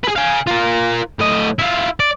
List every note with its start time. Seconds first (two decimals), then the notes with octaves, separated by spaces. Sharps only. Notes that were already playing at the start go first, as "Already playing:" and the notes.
0.04 G#4 B4
0.16 F5 G#5
0.47 F4 A#4
1.19 A2 D#5
1.59 E4 F4
2.00 D5